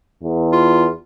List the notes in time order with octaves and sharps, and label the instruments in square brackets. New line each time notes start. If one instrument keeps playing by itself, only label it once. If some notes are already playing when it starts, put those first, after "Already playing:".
[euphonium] E2
[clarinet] F4